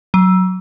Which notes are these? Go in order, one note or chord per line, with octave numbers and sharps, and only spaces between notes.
F#3